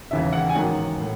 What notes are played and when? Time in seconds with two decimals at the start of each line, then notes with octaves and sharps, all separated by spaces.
0.11 E1 D#2 C#3 E3 E5
0.33 F#5
0.49 G#5
0.55 A1 G#2 D#3 F#3 F#5
1.00 A2